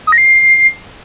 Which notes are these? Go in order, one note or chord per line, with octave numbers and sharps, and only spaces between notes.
D#6
A#6
C7